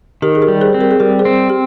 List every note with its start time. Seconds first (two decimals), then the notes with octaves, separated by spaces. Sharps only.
0.22 D#3 G4 A#4
0.35 G#4
0.42 G4 A#4
0.48 G3
0.61 G#4 C5
0.74 C4
0.81 G4 A#4
0.91 G#4
1.00 G3 G4 A#4
1.19 G#4 C5
1.25 C4
1.50 G4